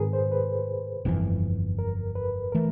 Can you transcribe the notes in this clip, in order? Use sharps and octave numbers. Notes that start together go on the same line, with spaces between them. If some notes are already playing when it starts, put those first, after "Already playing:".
Already playing: G#2 D#3 G#3 C4 G#4 A#4 B4
C5
B4
G1 F2 C#3 E3
A#4
B4
E3 A3 A#4